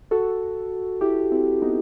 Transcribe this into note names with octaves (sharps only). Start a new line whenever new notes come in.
F#4 A4
E4 G4
C4 E4
B3 D#4